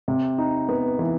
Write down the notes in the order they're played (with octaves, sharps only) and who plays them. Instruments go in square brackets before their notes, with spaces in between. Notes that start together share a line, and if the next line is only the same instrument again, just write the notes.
[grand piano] C3
D#4
B3
E3